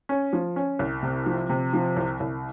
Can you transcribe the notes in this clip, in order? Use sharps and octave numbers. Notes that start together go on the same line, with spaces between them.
C#4
F3
C#4
C2
C3
F3
C3
F3
C2
C2